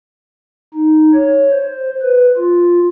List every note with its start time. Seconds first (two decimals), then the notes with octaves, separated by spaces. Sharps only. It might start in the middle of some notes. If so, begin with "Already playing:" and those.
0.74 D#4
1.14 C#5
1.52 C5
2.02 B4
2.38 F4